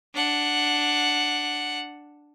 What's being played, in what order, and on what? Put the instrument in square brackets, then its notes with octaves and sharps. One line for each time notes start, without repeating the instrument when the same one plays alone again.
[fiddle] D4 F#5